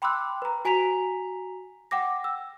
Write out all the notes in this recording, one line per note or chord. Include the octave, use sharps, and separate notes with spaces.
G5 B5 C6 D6 E6 F#6
B4 A#5
F#4 G#5 A#5 B6 F7
F#5 G5 D6 A#6
E6